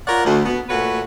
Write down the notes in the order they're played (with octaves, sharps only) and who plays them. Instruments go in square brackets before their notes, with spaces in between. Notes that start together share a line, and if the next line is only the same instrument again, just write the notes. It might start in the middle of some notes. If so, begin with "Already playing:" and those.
[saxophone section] F4 A#4 C#5 D5 F#5
D2
B2 B3
A#2 A3 F#4 B4 C#5